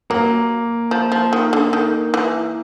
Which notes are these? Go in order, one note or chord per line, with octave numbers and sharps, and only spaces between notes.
F#3 A#3
F3
F3
D#3
D3
D#3
E3